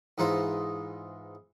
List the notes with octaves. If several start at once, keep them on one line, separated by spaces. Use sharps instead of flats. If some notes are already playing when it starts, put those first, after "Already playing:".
G#2 E3 D#4 F4 C5